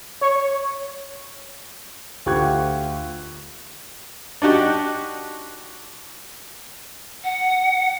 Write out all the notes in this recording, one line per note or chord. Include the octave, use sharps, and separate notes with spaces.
C#5
D2 F4 G4 C#6 F#6 G#6
D4 D#4 F#4 G4
F#5